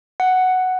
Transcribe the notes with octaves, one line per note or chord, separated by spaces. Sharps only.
F#5